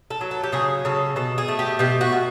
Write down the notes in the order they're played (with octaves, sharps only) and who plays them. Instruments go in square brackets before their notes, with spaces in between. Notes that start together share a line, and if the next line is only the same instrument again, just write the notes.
[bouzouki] A4
F#3
A4
G4
C#3 G#4
C#3 A4
B2 A4
G#4
A3
G4
B2 G4
F#4
B2